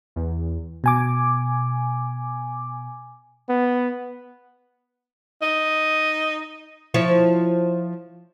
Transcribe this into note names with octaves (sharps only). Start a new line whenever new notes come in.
E2
B2 G#5 D6
B3
D#4
F3 E4 C#5